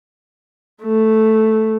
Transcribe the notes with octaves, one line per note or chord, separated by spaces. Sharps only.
A3